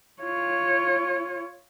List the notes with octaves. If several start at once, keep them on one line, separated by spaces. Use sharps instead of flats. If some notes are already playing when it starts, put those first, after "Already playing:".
F4 C#5